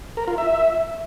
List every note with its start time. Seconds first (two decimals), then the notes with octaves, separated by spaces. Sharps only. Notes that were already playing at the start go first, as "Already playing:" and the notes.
0.17 A#4
0.28 F4
0.38 E5